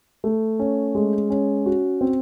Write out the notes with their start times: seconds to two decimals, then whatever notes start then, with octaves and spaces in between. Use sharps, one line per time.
0.24 A3
0.59 C#4
0.95 G#3
1.30 C#4
1.66 F#4
2.01 C4